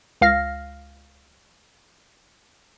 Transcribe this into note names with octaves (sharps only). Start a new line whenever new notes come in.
C#2 F5 F6 A#6